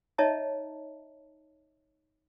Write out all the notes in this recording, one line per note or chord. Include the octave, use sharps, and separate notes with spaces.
D#4 C#5 D#5 E5 A5 A#5